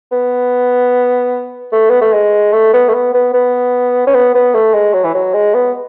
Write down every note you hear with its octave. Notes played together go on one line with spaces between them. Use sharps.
B3
A3
B3
A3
G#3
A3
B3
A3
B3
B3
B3
C#4
B3
B3
A3
G#3
F#3
E3
F#3
G#3
B3